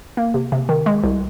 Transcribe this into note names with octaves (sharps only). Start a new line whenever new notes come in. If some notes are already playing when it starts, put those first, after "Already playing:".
A#3
C3
C3
D#3
G#3
C2